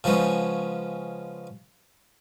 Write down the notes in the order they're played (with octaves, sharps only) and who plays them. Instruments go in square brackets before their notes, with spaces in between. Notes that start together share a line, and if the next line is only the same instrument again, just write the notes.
[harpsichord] C#3 F3 G#3 B3 C#4